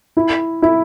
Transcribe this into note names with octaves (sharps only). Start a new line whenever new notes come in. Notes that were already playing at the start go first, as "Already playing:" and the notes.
E4
E4